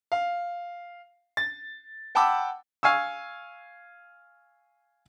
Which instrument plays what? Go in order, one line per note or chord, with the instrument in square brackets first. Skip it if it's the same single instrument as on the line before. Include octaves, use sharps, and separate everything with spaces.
[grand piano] F5
A6
F#5 G5 A5 B5 D6 E6
[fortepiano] F5 G#5 C#6 E6